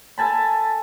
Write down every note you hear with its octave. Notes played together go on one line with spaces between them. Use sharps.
A4 G#5 A5 B5